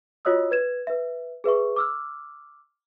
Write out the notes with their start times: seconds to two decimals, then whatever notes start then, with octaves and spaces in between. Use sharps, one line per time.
0.25 F4 F#4 C#5 D#5 D#6 E6
0.51 B4 G#6 E7
0.87 B4 E5
1.44 G#4 B4 E5 C#6
1.76 D6 E6 F6